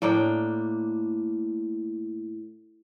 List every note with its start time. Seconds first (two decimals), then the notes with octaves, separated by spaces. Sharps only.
0.02 A2 A#3 D4 G5